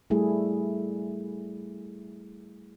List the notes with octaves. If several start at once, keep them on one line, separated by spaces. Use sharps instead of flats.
G3 A3 E4 G#4